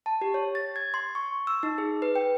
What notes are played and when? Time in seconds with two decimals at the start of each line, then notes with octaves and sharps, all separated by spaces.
0.06 A5
0.21 G4
0.34 C#5
0.55 A6
0.76 G#6
0.94 C6
1.15 C#6
1.47 E6
1.63 D#4
1.78 G#4
2.02 B4
2.15 G5